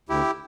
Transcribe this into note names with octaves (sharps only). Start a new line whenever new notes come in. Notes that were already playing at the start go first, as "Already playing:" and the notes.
D2 E4 G4